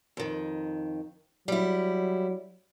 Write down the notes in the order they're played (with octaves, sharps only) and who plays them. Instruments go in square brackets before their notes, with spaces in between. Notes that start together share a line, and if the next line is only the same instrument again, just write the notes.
[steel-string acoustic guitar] F2 D#3
[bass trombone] F#3 [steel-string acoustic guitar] G3 E4